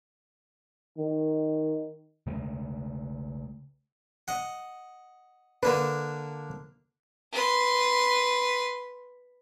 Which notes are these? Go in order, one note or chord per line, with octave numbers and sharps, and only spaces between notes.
D#3
C#3 G#3 A3
D#5 F#5
D3 A#3 D4 B4
B4 C6